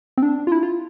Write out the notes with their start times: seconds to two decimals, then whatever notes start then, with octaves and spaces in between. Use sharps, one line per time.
0.18 C4
0.23 D4
0.47 F4
0.52 E4
0.63 F4